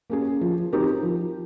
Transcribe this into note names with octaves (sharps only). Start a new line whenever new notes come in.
A#3 C#4 G#4
F3
C4 D#4 G4 A#4
F3